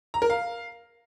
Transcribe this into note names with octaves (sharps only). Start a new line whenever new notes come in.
A#5
A#4
F5